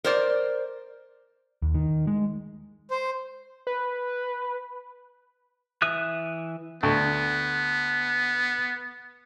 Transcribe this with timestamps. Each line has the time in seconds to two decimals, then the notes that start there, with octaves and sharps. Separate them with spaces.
0.04 A#4 C5 D5
1.62 D#2
1.75 D#3
2.07 G#3
2.91 C5
3.67 B4
5.82 E3 E5 D#6 F#6
6.83 D2 B3